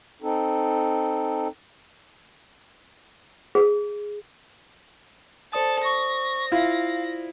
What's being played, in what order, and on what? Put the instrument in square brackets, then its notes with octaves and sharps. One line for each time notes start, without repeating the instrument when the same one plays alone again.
[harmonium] C4 D#4 A4
[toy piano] G#4
[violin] A4 A5 [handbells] C5 D5 D#6
[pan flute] C#6 [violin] A#6
[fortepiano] E4 F4 [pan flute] F5